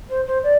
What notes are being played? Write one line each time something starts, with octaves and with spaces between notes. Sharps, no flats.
C5
C5
D5